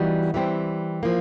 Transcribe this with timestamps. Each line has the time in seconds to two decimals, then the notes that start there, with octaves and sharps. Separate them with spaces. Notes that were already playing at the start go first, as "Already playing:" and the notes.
Already playing: E3 G3 B3 D#4 F#4
0.34 E3 G3 C4
1.03 F3 A#3